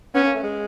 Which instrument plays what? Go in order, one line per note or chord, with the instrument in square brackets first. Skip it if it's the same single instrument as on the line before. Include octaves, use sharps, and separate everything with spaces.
[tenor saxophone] B3 [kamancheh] C#4
[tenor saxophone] A#3
A3
G#3